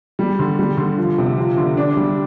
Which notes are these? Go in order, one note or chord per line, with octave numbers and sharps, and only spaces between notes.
G3
D3
G3
D3
F3
C3
F3
D3
D4
G3